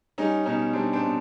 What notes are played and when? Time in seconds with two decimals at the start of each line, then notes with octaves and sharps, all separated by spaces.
0.18 G3 C#4 D#4
0.45 B2 C#4 D#4
0.73 G3 C4 D4
0.93 C4 D4
1.01 B2